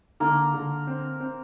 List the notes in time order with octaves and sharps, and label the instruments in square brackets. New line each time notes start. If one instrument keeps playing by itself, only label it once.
[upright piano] D3 [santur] A#3 A#4
[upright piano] D3
C4
C4